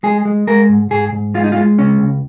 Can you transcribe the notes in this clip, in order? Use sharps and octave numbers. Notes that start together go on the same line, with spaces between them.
G#3 G#4
G#3
G#3 A#4
G#2
G#2 G#4
G#2
G#3 F4
D#4
F4
G#3
C#2 C#4
C#2